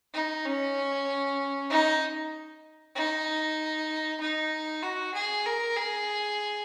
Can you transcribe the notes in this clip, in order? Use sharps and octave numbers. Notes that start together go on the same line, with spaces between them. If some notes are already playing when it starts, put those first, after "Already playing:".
D#4
C#4
D#4
D#4
D#4
F#4
G#4
A#4
G#4